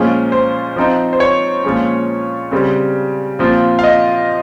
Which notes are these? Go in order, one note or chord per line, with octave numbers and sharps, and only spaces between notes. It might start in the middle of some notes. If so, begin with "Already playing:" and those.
Already playing: A#2 F3 G#3 C#4 C5
C5
F3 C4 D#4
C5
C#5
A#2 F3 G#3 C#4
C#3 G3 C4
A#2 F3 C4 F4
F5
D#5